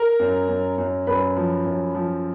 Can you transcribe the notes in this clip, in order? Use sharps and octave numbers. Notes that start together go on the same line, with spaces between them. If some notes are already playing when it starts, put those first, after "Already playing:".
Already playing: A#4 A#5
F#2
F#2
F#2
F#2 B4 B5
F3
F#2
F3